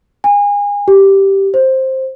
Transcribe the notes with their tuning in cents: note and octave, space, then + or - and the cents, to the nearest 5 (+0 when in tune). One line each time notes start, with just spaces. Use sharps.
G#5 -30
G4 -5
C5 +10